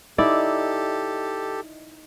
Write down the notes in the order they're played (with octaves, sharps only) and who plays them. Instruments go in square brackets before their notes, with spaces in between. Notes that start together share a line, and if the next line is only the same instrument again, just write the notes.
[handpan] D#4 D#5 [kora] E4 D5 [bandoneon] G4 A4